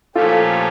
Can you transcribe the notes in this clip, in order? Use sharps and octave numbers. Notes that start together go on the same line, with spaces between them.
A#2 F3 A3 C#4 F4 G4 A4